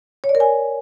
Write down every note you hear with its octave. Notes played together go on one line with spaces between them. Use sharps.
C#5
D5
A#4
G#5